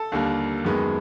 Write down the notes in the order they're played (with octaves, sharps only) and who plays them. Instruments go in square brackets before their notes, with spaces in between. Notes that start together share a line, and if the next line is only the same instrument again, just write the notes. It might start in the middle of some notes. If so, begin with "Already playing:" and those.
Already playing: [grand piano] A4 A5
D#2 D3 G3 A#3
F#2 D#3 G#3 B3